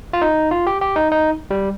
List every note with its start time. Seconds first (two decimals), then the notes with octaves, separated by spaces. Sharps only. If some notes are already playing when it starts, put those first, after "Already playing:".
0.13 F4
0.22 D#4
0.51 F4
0.67 G4
0.81 G4
0.96 D#4
1.12 D#4
1.51 G3